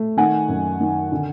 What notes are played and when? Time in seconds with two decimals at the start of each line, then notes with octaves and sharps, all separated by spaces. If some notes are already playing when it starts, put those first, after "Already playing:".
Already playing: A3
0.17 D#3 F#5 G#5
0.48 F#2
0.80 D#3
1.12 D3